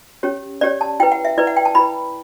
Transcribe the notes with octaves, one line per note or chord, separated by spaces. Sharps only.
C#4 G4 C#5
C#4 G4 C#5 D5
A5
E4 B4 G5
F#5
E5
E4 B4 D5
F#5
G5
A5
E4 B4 B5